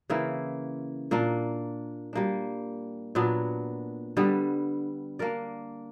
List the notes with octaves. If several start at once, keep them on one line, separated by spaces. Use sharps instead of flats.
C#3 E3 A#3 E4
A#2 A#3 D4
G3 A#3 D4
A#2 F#3 B3 D4
D3 G3 B3
A#3 D4 A#4 D5